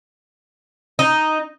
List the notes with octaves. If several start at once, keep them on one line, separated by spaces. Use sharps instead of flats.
D#4